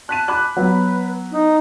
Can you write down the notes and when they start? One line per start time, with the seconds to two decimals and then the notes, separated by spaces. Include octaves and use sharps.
0.09 A5 F#6 B6 D#7
0.28 B5 D6 F#6
0.57 F#3 B3 B4
1.32 D#4